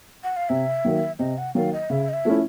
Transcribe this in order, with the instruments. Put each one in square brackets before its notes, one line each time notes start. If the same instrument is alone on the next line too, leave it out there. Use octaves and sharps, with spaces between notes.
[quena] F#5
F5
[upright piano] C3 [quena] E5
[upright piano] D#3 F#3 A#3
[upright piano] C3 [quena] D#5
[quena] F#5
[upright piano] D#3 F#3 A#3 [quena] F5
[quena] D#5
[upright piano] C#3 [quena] E5
[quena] D#5
E5
[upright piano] F3 A3 C#4 E4